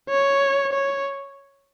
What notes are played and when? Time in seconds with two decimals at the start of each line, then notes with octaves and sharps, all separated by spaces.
0.09 C#5
0.73 C#5